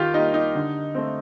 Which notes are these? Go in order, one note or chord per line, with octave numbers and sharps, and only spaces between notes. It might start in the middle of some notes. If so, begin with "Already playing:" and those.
Already playing: D#3 F4 G4
G3 A#3 D#4
D#4
D3
A3 C4